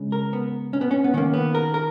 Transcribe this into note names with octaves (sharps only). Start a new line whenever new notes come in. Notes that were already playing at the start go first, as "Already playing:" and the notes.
Already playing: C#3 G#3
A#4
B3
C#4
B3
C#4
B3
D#3 A#3 C#4
B3
A#4
A#4